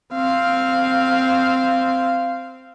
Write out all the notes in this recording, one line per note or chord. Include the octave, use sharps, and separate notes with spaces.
C4 F5